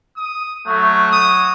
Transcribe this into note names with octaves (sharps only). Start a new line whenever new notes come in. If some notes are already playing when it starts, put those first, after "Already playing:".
D#6
F#3 A3
D#6